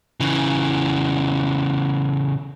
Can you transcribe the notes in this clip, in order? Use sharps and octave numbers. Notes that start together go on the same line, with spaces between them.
C#3 E3